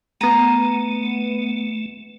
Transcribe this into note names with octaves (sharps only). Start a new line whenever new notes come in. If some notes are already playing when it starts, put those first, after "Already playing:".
A3 B3 A#5 D#7